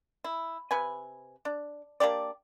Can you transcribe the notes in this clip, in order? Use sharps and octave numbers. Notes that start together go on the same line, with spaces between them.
E4
C3 B4 G#5
D4
A#3 D4 G4 D5